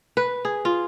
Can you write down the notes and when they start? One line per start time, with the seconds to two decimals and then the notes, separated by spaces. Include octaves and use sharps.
0.17 B4
0.45 G#4
0.65 F4